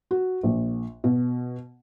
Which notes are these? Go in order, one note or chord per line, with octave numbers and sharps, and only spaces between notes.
F#4
A#1
B2